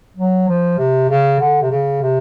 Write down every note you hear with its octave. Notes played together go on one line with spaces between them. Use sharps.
F#3
F3
C3
C#3
D3
C3
C#3
C3